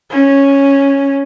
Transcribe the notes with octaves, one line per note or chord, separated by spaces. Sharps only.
C#4